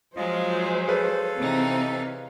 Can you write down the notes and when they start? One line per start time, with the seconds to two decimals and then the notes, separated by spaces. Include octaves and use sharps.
0.17 F3 F#3 G#3 F4 C5 D#5
0.88 G#4 A4 B4 C#5 F5
1.38 C3 E3 C4 D#4